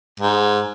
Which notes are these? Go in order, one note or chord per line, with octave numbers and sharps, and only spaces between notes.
G#2